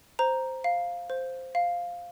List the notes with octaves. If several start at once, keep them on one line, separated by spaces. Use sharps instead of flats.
C5 A#5
F5
C5
F5